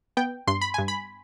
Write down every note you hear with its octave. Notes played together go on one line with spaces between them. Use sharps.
B3 G5
G2 C6
B5
G2 G#5
B5